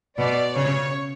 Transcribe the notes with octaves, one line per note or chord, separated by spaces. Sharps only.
B2 D5
C#3 C#5